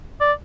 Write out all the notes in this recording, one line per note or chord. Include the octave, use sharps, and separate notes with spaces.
D5